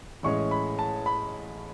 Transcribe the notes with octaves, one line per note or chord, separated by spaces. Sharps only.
A1 A2 G#3 C#4 C#6
B5
A5
B5